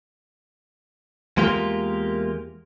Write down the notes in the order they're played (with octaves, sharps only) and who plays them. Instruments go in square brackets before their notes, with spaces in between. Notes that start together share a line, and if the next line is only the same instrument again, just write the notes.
[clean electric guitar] E2 G#3 A#3 F4 G4 A#4